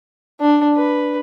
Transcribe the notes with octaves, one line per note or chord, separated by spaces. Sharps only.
D4
B4